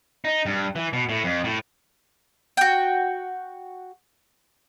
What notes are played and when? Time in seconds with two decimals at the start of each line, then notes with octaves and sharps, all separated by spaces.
0.25 D#4
0.46 G2
0.76 E3
0.93 B2
1.09 A2
1.24 F2
1.44 A2
2.57 F#4 G5